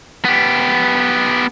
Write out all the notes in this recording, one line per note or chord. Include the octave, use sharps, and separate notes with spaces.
B3 G4